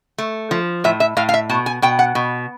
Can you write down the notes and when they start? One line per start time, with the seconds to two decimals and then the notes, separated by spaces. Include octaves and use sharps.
0.18 A3
0.51 F3
0.84 A2 E5
1.00 E5
1.17 A2 F5
1.29 F5
1.34 E5
1.50 B2 A5
1.66 G#5
1.82 B2 G5
1.99 F#5
2.15 B2